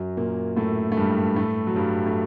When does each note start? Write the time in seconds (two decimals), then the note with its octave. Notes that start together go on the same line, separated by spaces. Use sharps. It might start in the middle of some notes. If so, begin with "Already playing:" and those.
Already playing: F#2 F#3
0.17 A#2 A#3
0.57 A2 A3
0.92 A3
0.97 G2 G3
1.36 A2 A3
1.67 F#3
1.76 G2 G3
2.06 A3